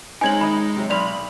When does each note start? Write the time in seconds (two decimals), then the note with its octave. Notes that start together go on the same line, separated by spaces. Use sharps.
0.21 G#3 C4 C#4 D#4 G#5 G#6 F#7
0.41 D#3 D#5 B5
0.76 C3 F#3
0.90 B1 D5 B5 C6 F6 F7